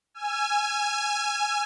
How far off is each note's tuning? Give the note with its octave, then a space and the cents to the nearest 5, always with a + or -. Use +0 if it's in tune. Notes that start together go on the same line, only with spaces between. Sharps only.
G#5 +0 E6 +40